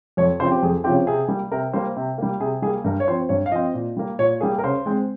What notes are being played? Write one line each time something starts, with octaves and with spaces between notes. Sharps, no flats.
F2 C#5
C#3 F3 C4 C5
G4
F2 G#4
C#3 F3 C4 G4
C3 G#4
G3 A#3
C3 A#4
G3 A#3 C5
C3
G3 A#3
C3 G#4
G3 A#3 G#4
G2 A#4
C#5
F3 C4 C5
G2 C#5
F5
F3 C4 D#5
A#2
G3 A#3
A#2 C#5
G3 A#3 G#4
A#4
C#3 C5
G#3 C4